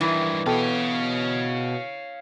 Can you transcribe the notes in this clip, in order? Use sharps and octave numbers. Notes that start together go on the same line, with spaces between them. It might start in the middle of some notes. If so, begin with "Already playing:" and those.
G2 D#3 E3
B2 A4 C#5 F5 G5 A5